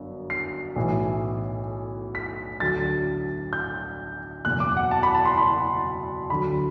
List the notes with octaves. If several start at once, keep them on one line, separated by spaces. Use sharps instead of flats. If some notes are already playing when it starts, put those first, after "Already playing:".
Already playing: G1 F#2
C7
B1 A2 E3
B6
D2 D3 F#3 A6
G6
F#1 E2 B2 F#3 F#6
D6
F#5
A5
B5
A5
C6
B5
D2 D3 F#3 B5